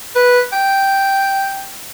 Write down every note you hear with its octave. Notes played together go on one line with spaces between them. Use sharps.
B4
G5